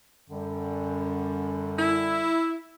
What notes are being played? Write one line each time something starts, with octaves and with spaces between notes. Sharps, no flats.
F#2 D3 G3
E4